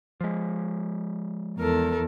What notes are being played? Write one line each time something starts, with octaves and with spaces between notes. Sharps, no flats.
F3 G#3
E2 A4 A#4